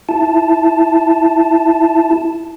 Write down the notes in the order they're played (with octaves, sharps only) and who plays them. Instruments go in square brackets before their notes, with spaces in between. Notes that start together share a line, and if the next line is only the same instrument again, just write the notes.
[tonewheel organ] E4 A5